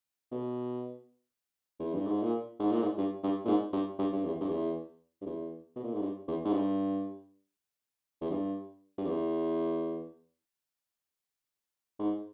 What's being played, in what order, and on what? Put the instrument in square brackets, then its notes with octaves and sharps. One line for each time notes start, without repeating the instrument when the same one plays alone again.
[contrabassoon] B2
E2
G2
G#2
A#2
G#2
A#2
G#2
G2
G2
A#2
G#2
G2
G2
G2
E2
G2
E2
G2
E2
B2
A#2
G#2
G2
E2
G#2
G2
E2
G2
G2
E2
G#2